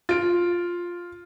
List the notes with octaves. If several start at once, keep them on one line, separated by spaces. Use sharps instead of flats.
F4 D7